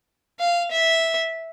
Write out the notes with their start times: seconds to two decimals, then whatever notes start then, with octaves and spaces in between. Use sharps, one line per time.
0.40 F5
0.71 E5